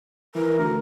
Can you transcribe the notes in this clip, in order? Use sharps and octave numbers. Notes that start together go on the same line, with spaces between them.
E3 A#4
D2